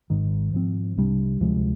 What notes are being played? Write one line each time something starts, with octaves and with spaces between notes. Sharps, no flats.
G#1 G#2 D#3
G#2 F3 C4
C2 C3 G3 D4
D2 C3 F3 G#3